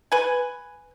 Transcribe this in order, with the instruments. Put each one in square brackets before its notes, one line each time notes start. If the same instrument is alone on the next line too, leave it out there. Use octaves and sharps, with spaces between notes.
[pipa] B4 G#5